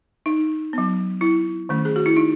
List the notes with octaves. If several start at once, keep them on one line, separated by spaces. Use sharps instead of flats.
D#4
F#3 B3
E4
D#3 A3 C#4
G#4
F#4
E4
D#4